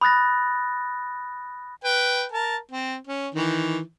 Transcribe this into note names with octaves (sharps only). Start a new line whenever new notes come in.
B5 D#6 F#6 A6 A#6
B4 G5
A#4 A5
C4
C#4
D#3 E3